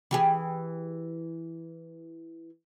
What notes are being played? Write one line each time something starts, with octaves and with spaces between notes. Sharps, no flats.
E3 G4 G#4